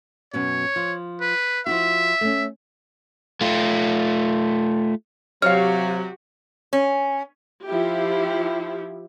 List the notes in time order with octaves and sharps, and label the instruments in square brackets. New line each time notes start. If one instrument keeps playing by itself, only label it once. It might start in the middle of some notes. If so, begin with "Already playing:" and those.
[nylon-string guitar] F#2 B2 C#4 [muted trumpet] C#5
[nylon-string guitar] F3
[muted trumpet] B4
[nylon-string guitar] F3 E4 F#4 [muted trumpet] E5
[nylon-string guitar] A3 C#4
[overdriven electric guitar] A3 F4
[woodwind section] C3 F#3 [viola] F#4 G4 [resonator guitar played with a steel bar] C#5 F5 [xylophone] F6
[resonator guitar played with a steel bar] C#4
[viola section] F3 E4 G4